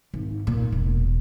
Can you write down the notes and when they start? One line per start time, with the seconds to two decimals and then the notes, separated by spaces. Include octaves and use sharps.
0.14 G#1
0.47 A#2
0.72 E1